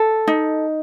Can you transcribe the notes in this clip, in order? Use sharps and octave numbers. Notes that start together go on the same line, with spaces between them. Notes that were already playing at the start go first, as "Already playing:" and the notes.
Already playing: A4
D#4